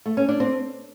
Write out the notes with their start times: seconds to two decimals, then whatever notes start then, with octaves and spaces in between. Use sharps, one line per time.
0.06 A3
0.17 C#4
0.29 D4
0.40 C4